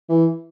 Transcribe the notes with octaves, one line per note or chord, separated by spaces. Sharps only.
E3